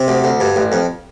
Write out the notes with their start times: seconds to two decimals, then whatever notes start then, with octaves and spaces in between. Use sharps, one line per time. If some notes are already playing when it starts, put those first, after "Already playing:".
Already playing: C3
0.08 D2
0.24 D2
0.40 G2
0.56 A1
0.72 F2